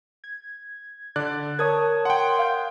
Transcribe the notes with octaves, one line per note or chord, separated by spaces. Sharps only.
G#6
D3 D5 F#6
A#4 C#5 A5 D#6 G#6
F#5 G5 C6
F5 G6